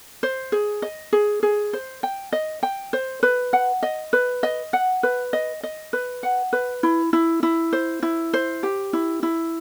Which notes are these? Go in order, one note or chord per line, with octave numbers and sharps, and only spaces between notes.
C5
G#4
D#5
G#4
G#4
C5
G5
D#5
G5
C5
B4
F#5
D#5
B4
D#5
F#5
B4
D#5
D#5
B4
F#5
B4
E4
E4
E4
C5
E4
C5
G4
E4
E4